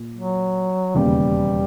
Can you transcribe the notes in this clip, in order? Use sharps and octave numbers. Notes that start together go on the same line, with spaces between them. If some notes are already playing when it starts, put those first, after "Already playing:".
Already playing: A#2 A#3
F#3
E1 D#2 C#3 G3